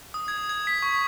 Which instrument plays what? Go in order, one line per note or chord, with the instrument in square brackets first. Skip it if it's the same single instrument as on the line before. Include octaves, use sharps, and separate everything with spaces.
[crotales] D#6
G#6
G#6
B6
C#6